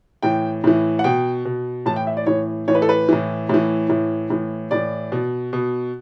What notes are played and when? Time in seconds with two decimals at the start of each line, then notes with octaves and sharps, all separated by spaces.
0.23 A2 E3 G5
0.64 A2 E3
0.99 F#5
1.04 B2 G5
1.45 B2
1.86 A2 E3 A5
1.96 G5
2.07 E5
2.17 D5
2.26 A2 E3 C#5
2.68 A2 E3 C#5
2.75 B4
2.82 A4
2.89 B4
3.09 A2 E3
3.49 A2 E3
3.90 A2 E3
4.30 A2 E3
4.71 A2 E3 D5
5.12 B2
5.53 B2